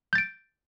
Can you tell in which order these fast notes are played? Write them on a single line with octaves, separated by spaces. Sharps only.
G6 A6 D7